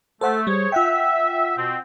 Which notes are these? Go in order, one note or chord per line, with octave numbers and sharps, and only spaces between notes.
A3 A4 C5 F#5
G3 G#4 C5 C#5
F4 E5 F#5 G5
B2 C4